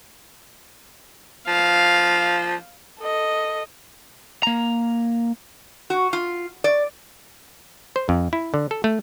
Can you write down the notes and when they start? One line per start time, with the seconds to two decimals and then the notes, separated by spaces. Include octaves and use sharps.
1.48 F3 F5
3.00 A4 D#5
4.43 A#3 A#5
5.90 F#4
6.13 F4
6.64 D5
7.96 C5
8.09 F2
8.33 E4
8.54 D3
8.71 A4
8.84 A3